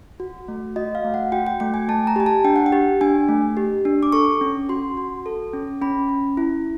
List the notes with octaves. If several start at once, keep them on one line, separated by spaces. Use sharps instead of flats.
F#4
A3
F#4 D#5
F5
A3
F#5
F#4 G5
G5
A3 G5
G#5
A3 A5
A#5
G4 G#5
A5
D4 G5
F#5
G5
G4
D4 G#5
A3
G4
D4
D6
A4 C#6
C#4
F#4 C6
F#4
A4
C#4
C#4 B5
C#4
E4